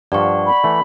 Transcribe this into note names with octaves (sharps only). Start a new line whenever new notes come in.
G2 F3 D5 F#5 C#6
B5
E3 A3